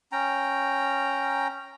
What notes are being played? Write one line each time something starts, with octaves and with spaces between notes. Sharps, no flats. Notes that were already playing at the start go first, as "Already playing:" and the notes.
C#4 G5 A#5